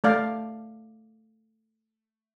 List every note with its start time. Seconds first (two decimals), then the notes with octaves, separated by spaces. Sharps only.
0.04 A3 D5 F5